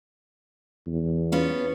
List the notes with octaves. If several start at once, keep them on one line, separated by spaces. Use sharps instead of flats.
E2
B3 C#4 F4